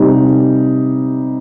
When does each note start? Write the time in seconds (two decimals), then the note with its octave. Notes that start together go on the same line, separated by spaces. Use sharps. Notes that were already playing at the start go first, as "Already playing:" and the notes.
Already playing: C3 G3 D#4